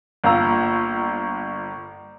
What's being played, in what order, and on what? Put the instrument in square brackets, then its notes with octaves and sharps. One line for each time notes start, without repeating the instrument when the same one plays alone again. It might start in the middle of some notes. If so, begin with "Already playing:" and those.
[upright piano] G1 A#3 F4 A#5 E6